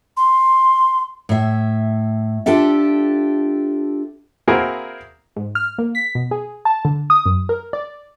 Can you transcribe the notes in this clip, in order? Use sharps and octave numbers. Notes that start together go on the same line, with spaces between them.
C6
A2 E5
D4 F4 G4 A4 E5
A#3 C4 E4 F#4 G#4 A#4
G#2
F6
A#3
B6
B2
G#4
A5
D3
D#6
F#2
A#4
D5